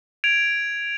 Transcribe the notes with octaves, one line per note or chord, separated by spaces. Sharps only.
G#6 D7 F7